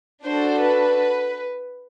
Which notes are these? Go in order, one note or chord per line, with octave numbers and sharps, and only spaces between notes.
D4 F#4 A4 C5
B4